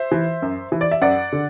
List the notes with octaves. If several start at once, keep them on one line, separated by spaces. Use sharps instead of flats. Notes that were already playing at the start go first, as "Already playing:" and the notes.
Already playing: C5 E5
E3
F#2
E3
D5
E5
F#2 D5 F#5
D3